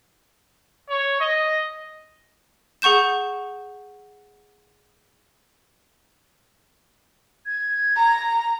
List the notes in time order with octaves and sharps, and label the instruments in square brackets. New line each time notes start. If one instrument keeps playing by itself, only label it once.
[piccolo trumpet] C#5
D#5
[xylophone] G#4 F#5 C#6 G6 E7
[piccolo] G#6
[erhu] A#5